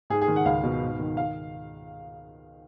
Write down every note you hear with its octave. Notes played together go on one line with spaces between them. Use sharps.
G#2 G#4
G#4
D#3
F#5
C#2 F5
B2
G#2
D#3
F5